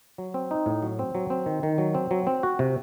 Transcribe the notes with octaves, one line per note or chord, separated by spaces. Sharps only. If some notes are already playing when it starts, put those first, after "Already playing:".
F#3
C4
D#4
A2
F#3
C4
F#3
C4
D#3
D#3
F#3
C4
F#3
C4
F#4
C3